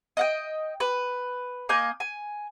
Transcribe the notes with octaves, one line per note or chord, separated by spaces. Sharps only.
D#5 F#5 G5
B4
A#3 D#5 G#5 G6
G#5